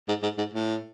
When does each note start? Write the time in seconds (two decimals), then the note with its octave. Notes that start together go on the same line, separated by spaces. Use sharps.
0.08 G#2
0.23 G#2
0.38 G#2
0.54 A2